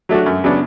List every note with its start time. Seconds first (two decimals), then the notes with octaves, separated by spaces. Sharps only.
0.09 F#3 A3 D4 F#4
0.26 F#2
0.44 C#3 F#3 B3 D4